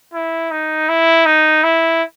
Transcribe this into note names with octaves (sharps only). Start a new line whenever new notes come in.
E4
D#4
E4
D#4
E4